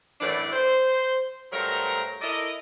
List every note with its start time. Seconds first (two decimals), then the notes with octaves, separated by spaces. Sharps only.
0.21 F#2 A2 E3 D4 E4 D5
0.52 C5
1.52 G2 F#3 A3 A#4 C5 A#5
2.22 E4 A4 A#4 D5 D#5